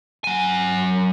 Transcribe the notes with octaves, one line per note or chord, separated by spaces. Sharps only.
F#3 G#5